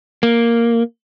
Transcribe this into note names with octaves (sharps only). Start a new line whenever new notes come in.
A#3